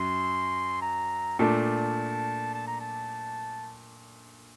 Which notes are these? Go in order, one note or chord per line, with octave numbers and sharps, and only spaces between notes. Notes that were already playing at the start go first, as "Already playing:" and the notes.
Already playing: F#2 F#3 C6
A#5
A#2 A3 D4 A5
A5
A#5
A5